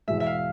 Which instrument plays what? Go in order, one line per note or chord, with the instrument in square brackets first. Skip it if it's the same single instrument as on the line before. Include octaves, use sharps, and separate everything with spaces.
[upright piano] E2 B2 G#3 [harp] E5
[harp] E5
F5